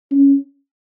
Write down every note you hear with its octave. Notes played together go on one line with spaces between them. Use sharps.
C#4